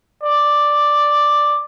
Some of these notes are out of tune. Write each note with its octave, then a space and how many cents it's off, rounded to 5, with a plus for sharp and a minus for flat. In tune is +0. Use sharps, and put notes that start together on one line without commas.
D5 +5